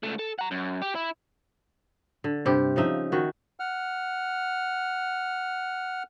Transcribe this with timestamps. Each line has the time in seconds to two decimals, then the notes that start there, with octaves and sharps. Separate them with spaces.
0.03 C#2 A3
0.19 A4
0.39 F#5 A#5
0.51 F#2
0.82 G4
0.95 E4
2.24 D3
2.45 G2 C3 G4
2.76 C#3 F3 D#4 E5
3.12 D#3 F#4
3.60 F#5 F6